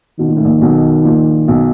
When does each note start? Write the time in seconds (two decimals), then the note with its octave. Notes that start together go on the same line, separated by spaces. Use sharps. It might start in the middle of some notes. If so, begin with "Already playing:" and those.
0.19 B2 D#3
0.27 A#2
0.37 A2
0.44 A#1 A#2
0.61 B1 B2
1.05 A#1 A#2
1.48 B1 B2